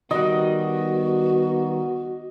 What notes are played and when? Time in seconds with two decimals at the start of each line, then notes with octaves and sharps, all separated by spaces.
0.11 D#3 G3 B3 F#4 D#5 F#5